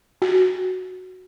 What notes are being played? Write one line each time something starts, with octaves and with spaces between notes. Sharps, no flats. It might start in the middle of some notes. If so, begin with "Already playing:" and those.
F#4